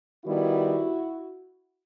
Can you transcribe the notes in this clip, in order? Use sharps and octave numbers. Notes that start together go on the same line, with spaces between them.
D#3 G3 B3 E4 F#4